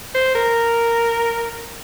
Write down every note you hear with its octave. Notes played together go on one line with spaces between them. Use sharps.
C5
A#4